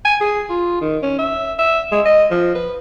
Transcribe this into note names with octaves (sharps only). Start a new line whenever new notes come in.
G#5
G#4
F4
D#3
C#4
E5
E5
G#3
D#5
F3
B4